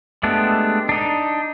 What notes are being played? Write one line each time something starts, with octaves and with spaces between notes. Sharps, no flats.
G#3 A3 B3 D4 G4
D4 D#4